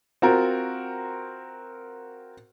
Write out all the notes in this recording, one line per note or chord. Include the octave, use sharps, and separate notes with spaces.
C4 F4 F#4 A#4